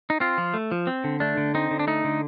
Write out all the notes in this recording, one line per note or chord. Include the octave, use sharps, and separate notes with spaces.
D#4
C4 F4
F3
A3
F3
C4
D3
A3 D4
D3
C4 D#4
D3
D4
A3 D#4
D3